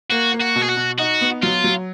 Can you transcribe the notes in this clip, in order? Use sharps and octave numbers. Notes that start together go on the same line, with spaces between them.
A#3 F#4
A#3
F#4
B2
G#4
F#4
B2
D#4 F#4
B3
F#3 F4
F#3